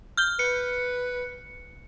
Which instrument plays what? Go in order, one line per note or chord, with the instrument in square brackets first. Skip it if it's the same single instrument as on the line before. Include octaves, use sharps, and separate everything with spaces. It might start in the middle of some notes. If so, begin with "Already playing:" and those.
[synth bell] F6 G6 G7
[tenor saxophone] B4 [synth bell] C#7